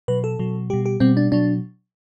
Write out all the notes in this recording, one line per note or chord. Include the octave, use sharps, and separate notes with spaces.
B2 F#3 B4
A4
B2 F#3
B2 G3 G4
G4
B2 G3 C4
D4
B2 F#3 D4